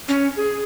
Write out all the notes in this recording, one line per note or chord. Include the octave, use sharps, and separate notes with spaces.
C#4
G#4